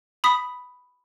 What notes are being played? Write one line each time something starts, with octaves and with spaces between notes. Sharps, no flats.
B5 D#6 B6